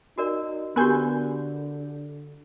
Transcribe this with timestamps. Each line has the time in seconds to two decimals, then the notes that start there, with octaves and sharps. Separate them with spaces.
0.18 D#4 F#4 A#4 D5
0.76 D3 B3 F#4 G4 A#4 G#5 G6